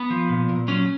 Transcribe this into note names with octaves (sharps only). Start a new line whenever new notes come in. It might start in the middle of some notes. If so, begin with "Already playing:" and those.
Already playing: B3
F3
A#2
A#2
F#3 C#4